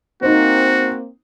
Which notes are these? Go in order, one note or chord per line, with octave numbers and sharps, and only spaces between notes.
A#3 C4 D#4 F#4 C5